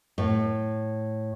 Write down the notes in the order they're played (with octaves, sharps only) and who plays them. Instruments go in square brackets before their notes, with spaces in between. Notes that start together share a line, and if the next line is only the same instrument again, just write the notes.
[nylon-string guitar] A2